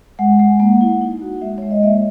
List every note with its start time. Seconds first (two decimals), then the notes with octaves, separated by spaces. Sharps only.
0.19 G#3 F#5
0.39 G#3
0.60 A#3
0.81 E4
1.01 D#4
1.21 F#4
1.41 G#3 E5
1.58 G#3 C#5
1.71 D#5
1.83 A#3 E5